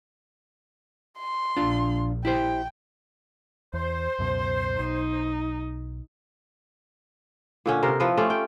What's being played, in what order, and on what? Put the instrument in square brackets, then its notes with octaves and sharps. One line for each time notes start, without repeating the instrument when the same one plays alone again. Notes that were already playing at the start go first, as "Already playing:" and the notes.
[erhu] C6
[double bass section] A#1 [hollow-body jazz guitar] D4 F4
[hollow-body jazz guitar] E4 G4 C5 [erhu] G5
[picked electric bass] E2 [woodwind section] C5
[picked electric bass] C#2 F#2 B2
[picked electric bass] B1 [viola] D#4
[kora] A#2 D3 C#4
C3 A#4 C5
F3 E4 A4 B4
A3 C#4 F4 G4
G5